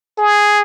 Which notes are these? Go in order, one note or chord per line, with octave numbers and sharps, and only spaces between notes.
G#4